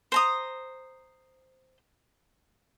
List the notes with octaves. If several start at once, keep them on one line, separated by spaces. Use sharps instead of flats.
C5 A#5 D#6